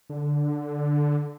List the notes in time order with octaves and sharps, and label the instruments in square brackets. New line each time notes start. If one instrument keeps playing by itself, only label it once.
[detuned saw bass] D3